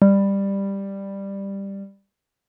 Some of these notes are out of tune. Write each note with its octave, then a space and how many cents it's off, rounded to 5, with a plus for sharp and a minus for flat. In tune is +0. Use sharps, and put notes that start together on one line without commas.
G3 +10